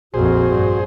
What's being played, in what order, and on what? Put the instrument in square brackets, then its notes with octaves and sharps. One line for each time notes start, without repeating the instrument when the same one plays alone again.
[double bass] A#1 F2 [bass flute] F#4 [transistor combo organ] G#4 C5
[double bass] G2